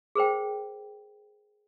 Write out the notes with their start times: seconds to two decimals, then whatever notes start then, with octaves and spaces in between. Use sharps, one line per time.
0.15 G#4 A#4 C5 G5